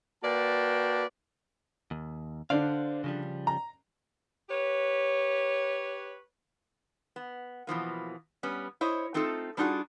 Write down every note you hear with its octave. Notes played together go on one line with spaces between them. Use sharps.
A#3 F#4 B4 D5 G5 A5
D#2
D3 D4 C5 D5 F5
C#3 F3 G3
A#5
G4 B4 C#5
B3
B2 E3 F3 A#3
G3 B3 C#4
E4 C5 C#5 D#5
A3 C4 D#4 F4 A4
G3 D4 D#4 F4 F#4 G#4